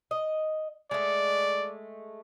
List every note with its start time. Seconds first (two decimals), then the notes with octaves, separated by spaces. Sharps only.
0.11 D#5
0.91 G#3 A3 D5